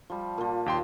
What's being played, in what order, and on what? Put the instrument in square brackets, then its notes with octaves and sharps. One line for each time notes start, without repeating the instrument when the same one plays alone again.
[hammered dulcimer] F3 G3
A#2 F3
[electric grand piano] D#2 G5 C6